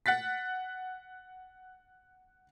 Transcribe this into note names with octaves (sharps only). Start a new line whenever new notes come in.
F#5 F#6 A6 B6